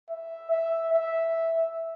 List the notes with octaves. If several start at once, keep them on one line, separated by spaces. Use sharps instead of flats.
E5
E5
E5